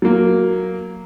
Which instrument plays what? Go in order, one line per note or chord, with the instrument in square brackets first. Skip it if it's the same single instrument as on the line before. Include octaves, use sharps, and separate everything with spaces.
[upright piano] F#3 A#3